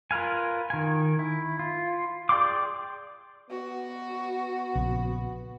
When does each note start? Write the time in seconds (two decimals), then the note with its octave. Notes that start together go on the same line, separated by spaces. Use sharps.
0.11 F4 A#4 B4 F5 G#5
0.70 D#3 G#5
1.19 E4
1.59 F4
2.29 G#4 D5 G5 C6 D6
3.50 B3 F#4
4.75 A#1 C#3